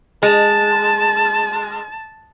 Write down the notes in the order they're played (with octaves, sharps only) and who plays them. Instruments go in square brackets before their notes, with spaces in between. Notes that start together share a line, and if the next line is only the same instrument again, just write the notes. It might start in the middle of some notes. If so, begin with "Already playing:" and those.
[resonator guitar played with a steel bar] G#3 [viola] A5